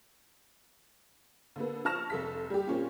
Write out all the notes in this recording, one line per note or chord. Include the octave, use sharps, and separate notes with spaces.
D3 A#3 B3
F3 A5 C#6 F6 A#6 E7
F1 A4 B6
G3 G4
A#2 C4 C#4 F4